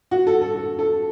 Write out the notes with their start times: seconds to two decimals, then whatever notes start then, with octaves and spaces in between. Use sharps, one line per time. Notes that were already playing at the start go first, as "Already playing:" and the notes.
0.11 F#4
0.27 A4
0.42 A4
0.56 A4
0.79 A4